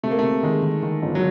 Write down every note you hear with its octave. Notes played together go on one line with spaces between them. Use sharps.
C3 A3
A#3
A3
C3
D#3 G#3
D#3
D#3
G1
F#3